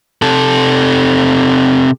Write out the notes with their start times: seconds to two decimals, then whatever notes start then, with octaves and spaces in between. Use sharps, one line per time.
0.22 C3 A4